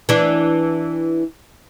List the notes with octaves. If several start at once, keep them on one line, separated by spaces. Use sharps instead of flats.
E3 D4